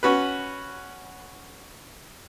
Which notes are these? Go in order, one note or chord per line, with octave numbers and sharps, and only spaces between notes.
C#4 F#4 B4